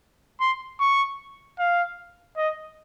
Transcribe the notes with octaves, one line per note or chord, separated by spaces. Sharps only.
C6
C#6
F5
D#5